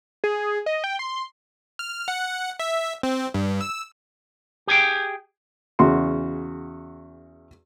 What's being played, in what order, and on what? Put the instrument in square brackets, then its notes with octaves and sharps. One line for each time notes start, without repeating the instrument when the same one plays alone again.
[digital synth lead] G#4
D#5
G5
C6
[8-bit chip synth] F6
F#5
E5
C4
G2
E6
[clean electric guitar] G4 G#4 G5
[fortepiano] E2 C#3 F#4 C6